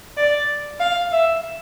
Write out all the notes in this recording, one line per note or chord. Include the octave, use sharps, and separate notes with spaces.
D5
F5
E5